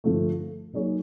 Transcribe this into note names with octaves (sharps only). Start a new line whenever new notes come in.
G2 D3 F3 A3
F#3 A#3 D#4 G#4 C#5